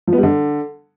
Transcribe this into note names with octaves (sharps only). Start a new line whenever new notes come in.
F3
B3
G3
D3